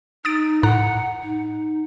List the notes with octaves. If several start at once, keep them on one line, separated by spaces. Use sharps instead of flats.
D#4 D#6 A6 D7
A2 F#5 A#5 F#6
D#4